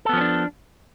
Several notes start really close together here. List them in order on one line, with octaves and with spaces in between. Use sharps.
A4 B3 F3 C#4 D4